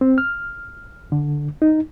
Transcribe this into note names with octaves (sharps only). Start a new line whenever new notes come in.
C4
F6
D3
D#4